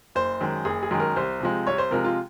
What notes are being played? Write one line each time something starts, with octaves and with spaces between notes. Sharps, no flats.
F#1 C5
F#2 D#3 G#3
F#1 G#4
G#4
F#2 D#3 G#3
A#4
C2 C5
C3 F3 G#3
C2 C#5
C5
C3 F3 G#3 A#4
F4